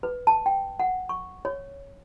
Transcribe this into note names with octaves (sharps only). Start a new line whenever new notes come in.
B4
A5
G5
F#5
C#6
C#5